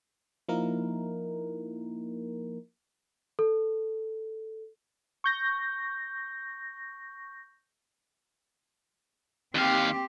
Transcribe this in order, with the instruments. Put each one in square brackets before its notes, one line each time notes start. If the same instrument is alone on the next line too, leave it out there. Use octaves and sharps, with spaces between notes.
[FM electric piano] F3 A#3 D#4 E4 A#4
[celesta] A4
[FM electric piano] C#6 G6 A#6
[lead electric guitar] D#2 F5 [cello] C4 G4